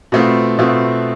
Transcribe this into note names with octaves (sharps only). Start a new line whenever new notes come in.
B2 A3 C4 F4
B2 A3 C4 F4